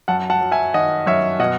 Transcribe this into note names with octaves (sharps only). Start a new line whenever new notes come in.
F#2 F#5 A5
F#5 A5
F#3
E5 G#5
D#3 D#5 F#5
F#2 C#5 E5
B2 D#5 F#5